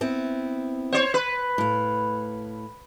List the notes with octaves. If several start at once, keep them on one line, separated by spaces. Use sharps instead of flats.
B3 C4 E4
C5 C#5
B4
A2 F5